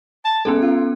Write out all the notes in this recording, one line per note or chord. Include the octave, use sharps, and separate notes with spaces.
A5
G#3 B3 C#4 A4
F4